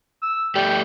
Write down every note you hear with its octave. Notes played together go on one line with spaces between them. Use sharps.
E6
A3 G4 D5 G5